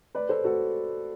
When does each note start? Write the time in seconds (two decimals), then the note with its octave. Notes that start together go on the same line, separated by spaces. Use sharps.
0.15 B4 D5
0.29 A4 C5
0.44 F#4 A4